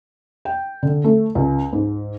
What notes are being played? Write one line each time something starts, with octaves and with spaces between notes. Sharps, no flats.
G5
D3
A3
C#2
G#2